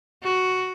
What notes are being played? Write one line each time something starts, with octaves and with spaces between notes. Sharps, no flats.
F#4